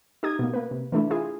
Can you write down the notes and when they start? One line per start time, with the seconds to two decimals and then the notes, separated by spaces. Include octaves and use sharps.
0.23 D#4 G4 D#6 G#6
0.39 B2 A#3
0.54 A#3 B4
0.71 C3
0.92 E3 A3 D4 E4
1.10 E4 F4 G#4